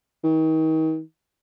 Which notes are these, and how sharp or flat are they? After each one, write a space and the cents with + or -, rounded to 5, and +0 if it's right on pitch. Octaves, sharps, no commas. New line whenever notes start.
D#3 +35